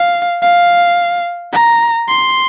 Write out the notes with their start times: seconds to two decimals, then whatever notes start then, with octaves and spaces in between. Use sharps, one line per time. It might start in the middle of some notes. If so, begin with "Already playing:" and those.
Already playing: F5
0.43 F5
1.53 A#5
2.08 C6